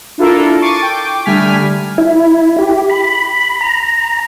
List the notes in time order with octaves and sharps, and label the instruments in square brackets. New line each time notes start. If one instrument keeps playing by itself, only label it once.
[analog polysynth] D4 E4 F4 A4 A#4
C#6 D6 A6 C7 D#7
G5 D6
D3 G3 A3 G#5 F6 B6
[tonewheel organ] E4
G4
B5
A#5